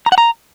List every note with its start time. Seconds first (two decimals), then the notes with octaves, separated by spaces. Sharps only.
0.06 A#5
0.12 F#5
0.18 A#5